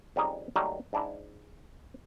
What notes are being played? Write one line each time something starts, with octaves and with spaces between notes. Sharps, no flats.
F2 G3 C#4 D#4 G#4
D#3 F#3 G3 A3 A#3
G#2 D4 E4